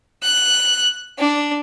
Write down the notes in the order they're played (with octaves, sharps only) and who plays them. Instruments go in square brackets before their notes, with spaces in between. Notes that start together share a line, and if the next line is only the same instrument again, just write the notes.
[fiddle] F#6
D4